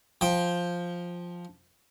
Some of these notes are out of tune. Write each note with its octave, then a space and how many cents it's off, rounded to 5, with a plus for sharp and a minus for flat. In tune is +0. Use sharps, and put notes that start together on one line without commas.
F3 +5 G5 +10